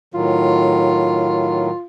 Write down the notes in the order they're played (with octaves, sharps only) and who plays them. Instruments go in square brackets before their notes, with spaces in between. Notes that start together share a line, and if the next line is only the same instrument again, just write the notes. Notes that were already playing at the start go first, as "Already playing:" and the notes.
[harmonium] A2 D#3 F#3 [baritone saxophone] F4